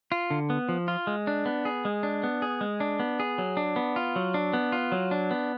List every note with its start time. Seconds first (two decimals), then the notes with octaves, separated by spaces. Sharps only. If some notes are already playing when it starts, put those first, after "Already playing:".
0.12 F4
0.31 D3
0.50 B3
0.69 F3
0.88 F4
1.07 G#3
1.27 D4
1.45 B3
1.65 G#4
1.85 G#3
2.03 D4
2.23 B3
2.42 G#4
2.61 G#3
2.80 D4
3.00 B3
3.20 G#4
3.38 F#3
3.57 D4
3.76 B3
3.96 F4
4.16 F#3
4.34 D4
4.53 B3
4.72 F4
4.92 F#3
5.11 D4
5.31 B3